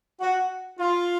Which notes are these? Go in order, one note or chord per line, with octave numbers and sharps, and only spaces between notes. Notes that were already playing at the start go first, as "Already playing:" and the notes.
F#4
F4